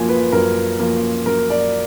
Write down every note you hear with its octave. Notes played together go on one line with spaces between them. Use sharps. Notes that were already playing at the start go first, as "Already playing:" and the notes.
Already playing: F#2 F3 A#3 F4 G#5
B4
F#2 A#4
F3 A#3 F4
F#2 A#4
D5